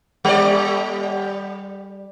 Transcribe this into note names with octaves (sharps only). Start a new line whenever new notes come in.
G3 D5